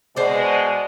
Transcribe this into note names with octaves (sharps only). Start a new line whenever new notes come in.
B2 G#3 C5 D5